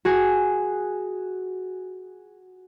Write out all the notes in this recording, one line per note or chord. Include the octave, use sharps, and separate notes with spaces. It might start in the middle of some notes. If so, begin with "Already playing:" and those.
F#4 G#4